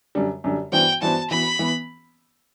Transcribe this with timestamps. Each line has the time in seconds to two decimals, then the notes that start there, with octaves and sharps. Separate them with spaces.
0.15 F#2 D3 G3
0.44 F#2 D3 G3
0.72 G2 E3 B3 F#4 C5 G5
1.02 G2 E3 B3 F#4 C5 A5
1.30 E3 B3 F#4 B5
1.59 E3 B3